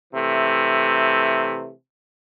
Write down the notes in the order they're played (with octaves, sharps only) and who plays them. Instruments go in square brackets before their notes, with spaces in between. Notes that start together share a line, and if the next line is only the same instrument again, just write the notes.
[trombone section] C3 E3 A3